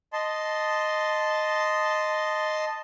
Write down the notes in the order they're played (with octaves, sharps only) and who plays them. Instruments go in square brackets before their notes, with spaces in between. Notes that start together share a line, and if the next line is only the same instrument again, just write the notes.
[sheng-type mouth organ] D#5 A5 C6